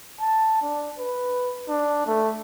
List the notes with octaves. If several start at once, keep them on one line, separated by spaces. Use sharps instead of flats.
A5
D4
B4
D4
A3